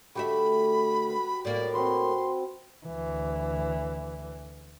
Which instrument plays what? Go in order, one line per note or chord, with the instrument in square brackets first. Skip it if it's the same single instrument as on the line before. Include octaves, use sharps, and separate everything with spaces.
[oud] D3 A3 E5 [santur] F#4 G4 [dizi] B5
[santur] B4
[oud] A2 A#3 [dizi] D5
[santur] C4 F#4 B4 [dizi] C6
[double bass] D2 E3